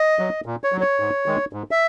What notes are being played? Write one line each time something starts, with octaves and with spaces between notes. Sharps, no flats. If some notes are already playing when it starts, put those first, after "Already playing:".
Already playing: D#5
F#3
A#2
C#5
F#3
C#5
G#2
D#3 G#3
G#2
E5